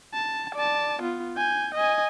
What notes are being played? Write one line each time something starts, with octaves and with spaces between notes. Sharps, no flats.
A5
D5 A5
B3 F4
G#5 G6
D#5 G#5